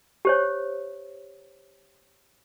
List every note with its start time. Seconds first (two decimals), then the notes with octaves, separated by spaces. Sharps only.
0.25 G4 C5 C#5